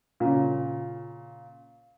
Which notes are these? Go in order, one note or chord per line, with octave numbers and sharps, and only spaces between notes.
A#2 C#3